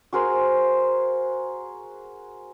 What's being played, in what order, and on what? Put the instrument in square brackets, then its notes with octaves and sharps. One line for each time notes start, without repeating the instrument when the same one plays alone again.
[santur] F#4 G#4 A#4 C5